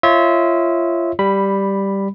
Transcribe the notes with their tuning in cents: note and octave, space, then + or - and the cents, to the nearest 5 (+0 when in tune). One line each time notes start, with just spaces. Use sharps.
F4 -30 C#5 -20 E5 -30
G3 +0 B5 +0